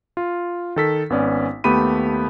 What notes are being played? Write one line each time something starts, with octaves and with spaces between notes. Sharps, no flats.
F4
D#3 A4 B6
G#1 B3 C#4 D5
D#2 A3 B3 G4 B5 D#7